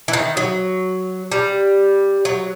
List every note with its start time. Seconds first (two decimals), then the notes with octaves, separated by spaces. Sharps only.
0.08 E3
0.13 D#3
0.37 F#3
1.32 G3
2.25 F#3